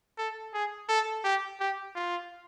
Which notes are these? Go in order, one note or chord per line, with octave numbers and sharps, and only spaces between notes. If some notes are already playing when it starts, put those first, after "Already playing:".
A4
G#4
A4
G4
G4
F4